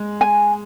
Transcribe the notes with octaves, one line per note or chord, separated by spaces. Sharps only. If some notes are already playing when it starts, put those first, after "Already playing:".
Already playing: G#3
G#5